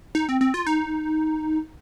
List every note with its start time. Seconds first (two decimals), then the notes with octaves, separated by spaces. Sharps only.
0.15 D#4
0.29 C4
0.41 C4
0.54 F4
0.66 D#4